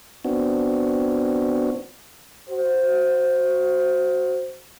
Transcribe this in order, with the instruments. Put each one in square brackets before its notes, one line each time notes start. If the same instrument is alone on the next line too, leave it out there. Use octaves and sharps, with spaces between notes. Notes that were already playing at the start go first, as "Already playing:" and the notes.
[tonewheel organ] B3 C4 D4 F#4
[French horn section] F#4 C5